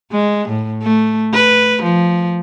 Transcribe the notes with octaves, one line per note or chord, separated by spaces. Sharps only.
G#3
A2
A3
B4
F3